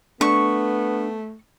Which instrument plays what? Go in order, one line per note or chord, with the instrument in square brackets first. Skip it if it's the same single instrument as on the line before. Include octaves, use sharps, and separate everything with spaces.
[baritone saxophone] A3 [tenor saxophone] B3 [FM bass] D4 [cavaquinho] C#6